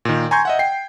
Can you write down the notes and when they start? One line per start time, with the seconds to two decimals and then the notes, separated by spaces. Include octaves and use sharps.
0.05 A#2 D#3
0.31 G#5 A#5 C6 C#6 G6 G#6
0.45 D#5 E5 F#5
0.59 G5 C7